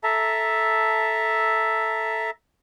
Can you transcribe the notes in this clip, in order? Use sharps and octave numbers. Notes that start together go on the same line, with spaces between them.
A4 E5 A5 A#5